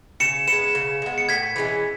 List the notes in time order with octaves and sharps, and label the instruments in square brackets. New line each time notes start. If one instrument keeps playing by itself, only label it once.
[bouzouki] C#3 [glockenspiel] C#7 E7
[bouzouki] B3 [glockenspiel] C#7 E7
[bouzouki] G#3
C#3
G#3 B3
[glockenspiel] C#7
[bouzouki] A2 [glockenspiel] G#6 B6
[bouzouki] E3 G#3 C#4